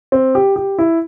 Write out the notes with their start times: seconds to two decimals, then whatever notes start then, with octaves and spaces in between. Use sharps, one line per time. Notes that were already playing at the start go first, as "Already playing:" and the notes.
0.12 C4
0.35 G4
0.56 G4
0.79 E4